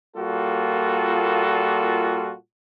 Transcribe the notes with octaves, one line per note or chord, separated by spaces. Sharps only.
A#2 G3 A#3 F4 F#4 A4